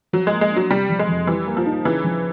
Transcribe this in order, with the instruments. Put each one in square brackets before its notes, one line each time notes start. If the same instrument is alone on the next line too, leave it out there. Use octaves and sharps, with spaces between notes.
[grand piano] F3 [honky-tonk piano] F#3
[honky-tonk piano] G#3
[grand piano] A#3
[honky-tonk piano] G#3
[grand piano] D4
[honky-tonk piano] F#3
[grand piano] C3 [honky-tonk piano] G3
[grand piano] F3
[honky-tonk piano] G#3
[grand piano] F2
[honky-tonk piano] E3 [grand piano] G3
[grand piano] A#3
[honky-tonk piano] F3
[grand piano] D#4
[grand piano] C#3 [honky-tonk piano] E3
[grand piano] F3